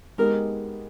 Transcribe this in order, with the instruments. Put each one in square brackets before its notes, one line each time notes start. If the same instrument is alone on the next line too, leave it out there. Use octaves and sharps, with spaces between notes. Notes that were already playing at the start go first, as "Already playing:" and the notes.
[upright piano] G#3 B3 D#4 G4 [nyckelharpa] A#4